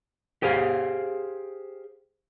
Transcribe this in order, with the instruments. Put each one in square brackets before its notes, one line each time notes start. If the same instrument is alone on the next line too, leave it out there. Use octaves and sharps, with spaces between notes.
[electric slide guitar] G4 G#4 C5 F5